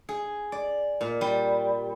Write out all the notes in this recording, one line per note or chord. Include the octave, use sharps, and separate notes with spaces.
G#4
D5
A#2
G3